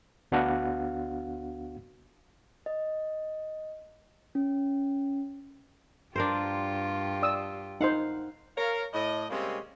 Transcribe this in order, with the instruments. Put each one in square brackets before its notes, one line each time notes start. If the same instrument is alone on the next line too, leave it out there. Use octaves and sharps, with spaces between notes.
[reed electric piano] D2 B3 D4 F#4 F5 F#5
[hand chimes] D#5
C#4
[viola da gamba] G2 F4 G4 [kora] D4 A#4 C5
[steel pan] D5 D#6 E6
[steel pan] D#4 C5 [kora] F5 F#5
[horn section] A#4 C#5 F5
A2 D#5
C3 G3 G#3 A#3 C4 C#4